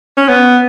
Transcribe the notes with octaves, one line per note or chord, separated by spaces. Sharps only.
C#4
B3